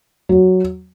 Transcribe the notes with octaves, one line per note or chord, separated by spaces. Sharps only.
F#3